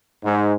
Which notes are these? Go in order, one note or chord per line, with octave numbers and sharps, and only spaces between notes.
G#2